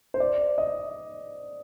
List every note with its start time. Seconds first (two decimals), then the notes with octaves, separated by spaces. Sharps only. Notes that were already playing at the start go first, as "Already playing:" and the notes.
0.14 C5
0.20 D5
0.58 D#5